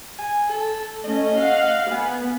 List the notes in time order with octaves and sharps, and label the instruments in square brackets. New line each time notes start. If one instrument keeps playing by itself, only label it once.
[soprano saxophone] G#5
A4
[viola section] A3 C#4 [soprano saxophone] D#5
[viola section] F5 F#5
[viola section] B3 [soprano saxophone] G#5